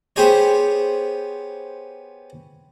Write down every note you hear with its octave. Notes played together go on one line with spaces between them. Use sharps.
B3 G4 G#4 C5 C#5